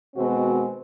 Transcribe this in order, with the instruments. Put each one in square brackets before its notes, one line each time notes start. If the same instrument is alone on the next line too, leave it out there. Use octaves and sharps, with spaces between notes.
[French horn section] B2 D#3 G#3 C4 F#4